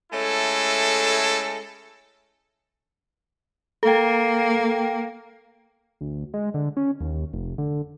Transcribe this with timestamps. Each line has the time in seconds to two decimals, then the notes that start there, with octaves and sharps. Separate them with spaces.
0.12 G#3 A3 C#4 E4 A4
3.83 A#3 A4 G5
6.01 D2
6.34 G#3
6.54 D3
6.77 C#4
7.01 D#2
7.34 F1
7.58 D3